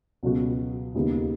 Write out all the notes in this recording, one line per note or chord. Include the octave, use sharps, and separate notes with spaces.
C#2 B2 F#3 B3 F#4
D#2 C#3 G#3 B3 D#4